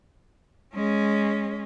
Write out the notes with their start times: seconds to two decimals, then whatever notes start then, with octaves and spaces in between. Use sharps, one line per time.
0.75 G#3 C#4